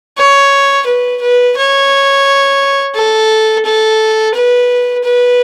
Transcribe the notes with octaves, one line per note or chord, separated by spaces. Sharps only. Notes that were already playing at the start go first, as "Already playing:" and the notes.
C#5
B4
B4
C#5
A4
A4
B4
B4